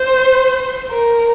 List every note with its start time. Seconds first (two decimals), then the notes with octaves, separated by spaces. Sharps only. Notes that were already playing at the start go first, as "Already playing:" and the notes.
Already playing: C5
0.91 A#4